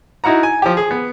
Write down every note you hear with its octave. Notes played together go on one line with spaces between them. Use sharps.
D#4 E4 F#4 F#5 A#5
G#5
F3 G4
G#4
B3